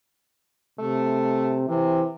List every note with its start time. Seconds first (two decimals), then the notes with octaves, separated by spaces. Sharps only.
0.80 C3 A3
1.69 C3 E3